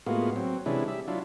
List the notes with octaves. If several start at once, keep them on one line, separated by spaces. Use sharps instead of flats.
A2 G#3 A#3 B3 F4 F#4
F#3 C4
C3 E3 G#3 C#4 D4 E4
G3 E5
F#3 D4 E4 F4